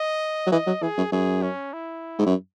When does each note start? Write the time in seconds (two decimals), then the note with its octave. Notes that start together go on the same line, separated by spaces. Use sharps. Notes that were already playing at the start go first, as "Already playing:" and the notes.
Already playing: D#5
0.46 F#3
0.52 E3 D#5
0.67 F#3
0.82 E3 G#4
0.98 F#2
1.12 F#2 G#4
1.43 C#4
1.73 E4
2.19 G#2
2.27 F#2